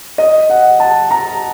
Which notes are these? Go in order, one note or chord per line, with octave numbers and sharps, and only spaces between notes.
D#5
F#5
A5
A#5